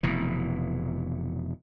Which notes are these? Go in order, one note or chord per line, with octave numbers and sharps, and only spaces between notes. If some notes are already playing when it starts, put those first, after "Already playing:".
F1 B2 E3